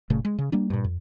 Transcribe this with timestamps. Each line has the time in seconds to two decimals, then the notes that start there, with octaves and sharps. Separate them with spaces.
0.10 F#1 A#2 C#3 A3
0.25 G#3
0.38 C#3
0.52 G3 A#3 D4
0.70 G2 A#2
0.84 F2